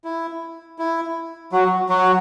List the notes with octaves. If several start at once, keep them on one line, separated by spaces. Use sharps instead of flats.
E4
E4
F#3 F#4
F#3 F#4